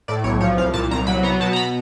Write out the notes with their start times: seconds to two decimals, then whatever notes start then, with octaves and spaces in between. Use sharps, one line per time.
0.08 A2 D5
0.24 B1 C#5
0.41 F3 C#5
0.57 C2 F5
0.74 A#2 A5
0.91 C2 A#5
1.07 F#3 B5
1.23 B3 A#5
1.40 B2 A5
1.53 A#5
1.56 B5